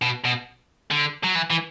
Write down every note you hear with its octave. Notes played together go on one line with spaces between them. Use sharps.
B2
B2
D3
F#3
E3
E3